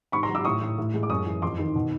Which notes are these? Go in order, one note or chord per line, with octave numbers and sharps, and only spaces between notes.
G#2 B5 C#6
A#5 C6
F#3
D6 E6
A2 C#6 D#6
A2
A2
G#3
D6
F#2 C#6 D#6
E3
F2 C6 D6
D#3
B2